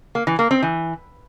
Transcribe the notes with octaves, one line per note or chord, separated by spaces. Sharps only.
A#3
E3
A#3
C4
E3